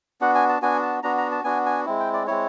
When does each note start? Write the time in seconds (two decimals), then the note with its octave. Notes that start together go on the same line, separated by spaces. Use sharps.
0.21 B3 D4 F#4 F#5
0.35 G#5
0.49 A5
0.62 B3 D4 F#4 G#5
0.82 A5
1.03 B3 D4 F#4 A#5
1.18 A#5
1.31 A5
1.44 B3 D4 F#4 G#5
1.66 G#5
1.86 G#3 C4 E4
2.00 G5
2.13 D5
2.27 G#3 C4 E4 C#5